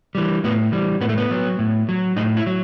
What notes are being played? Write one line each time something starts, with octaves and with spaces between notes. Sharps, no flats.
E3 G3
A2 B3
E3 G3
A2 B3
A3
B3
F#3
A2
F#3
A2 D#4
E4
F#3